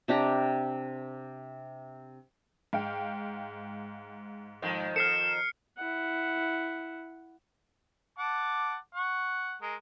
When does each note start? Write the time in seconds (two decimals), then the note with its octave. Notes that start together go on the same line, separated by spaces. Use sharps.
0.08 C3 D4 G4 A#5
2.73 G#2 F5 G5
4.62 F2 D#3
4.96 A4 F6 C7 C#7 E7
5.78 E4 F#5
8.19 F#5 A5 D6
8.95 F#5 C#6
9.62 G#3 A#4